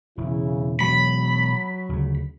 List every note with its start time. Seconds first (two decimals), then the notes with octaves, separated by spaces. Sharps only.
0.17 E1 C#3 E4
0.81 B2 E3 F#3 G#3 B5
1.89 D2 C#3